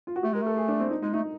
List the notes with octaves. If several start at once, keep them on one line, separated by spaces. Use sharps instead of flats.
F4
F#4
A3 G4
G#3 A#4
A3 A4
G#4
D4
C4
D#4
G#3 D#4
A3 D#4